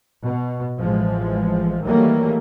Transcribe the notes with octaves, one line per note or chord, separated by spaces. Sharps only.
B2
A1 E3 F3 G#3
D#3 E3 F#3 G3 A3 A#3